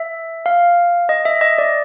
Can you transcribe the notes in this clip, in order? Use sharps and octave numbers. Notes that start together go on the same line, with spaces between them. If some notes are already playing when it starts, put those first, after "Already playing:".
Already playing: E5
F5
D#5
E5
D#5
D5